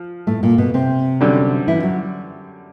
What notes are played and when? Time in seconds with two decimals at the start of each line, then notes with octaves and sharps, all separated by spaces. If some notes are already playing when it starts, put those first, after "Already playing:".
Already playing: F3
0.27 A2 A3
0.43 A#2 A#3
0.58 B2 B3
0.74 C3 C4
1.21 F#2 D3 G3
1.67 E3 E4
1.83 F#3 F#4